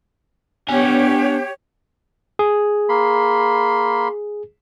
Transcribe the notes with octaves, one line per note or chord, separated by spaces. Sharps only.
B3 D4 G4 C#5 G#5
G#4
A#3 B5 C6